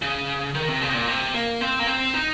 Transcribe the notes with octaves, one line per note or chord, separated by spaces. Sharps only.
C#3
D#3
C3
C#3
C3
A#2
C3
A#3
C4
A#3
C4
D#4